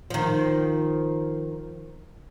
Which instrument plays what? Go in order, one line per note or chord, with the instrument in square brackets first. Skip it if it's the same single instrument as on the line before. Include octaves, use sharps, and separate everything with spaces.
[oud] D#3 F3